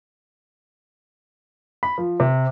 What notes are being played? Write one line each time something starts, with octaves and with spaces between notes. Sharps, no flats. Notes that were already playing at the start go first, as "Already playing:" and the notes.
B5
F3
C3